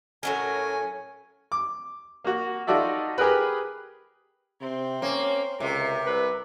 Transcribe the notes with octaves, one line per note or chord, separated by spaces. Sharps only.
A2 F#3 C#4 A#4 G#5
D6
A#3 F#4
D#4 F4 F#4 A4 D5 E5
G4 G#4 A#4 B4
C3 C4 C5
A#3 C#4
C#2 C3 A#4
C2 B4